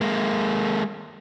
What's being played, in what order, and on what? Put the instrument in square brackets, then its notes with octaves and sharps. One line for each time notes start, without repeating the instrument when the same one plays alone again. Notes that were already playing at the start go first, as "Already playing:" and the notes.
[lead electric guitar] G#3 A#3